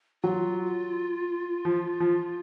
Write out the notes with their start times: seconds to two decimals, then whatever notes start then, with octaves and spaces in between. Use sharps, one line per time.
0.23 F#3 F4
1.65 F3
2.00 F3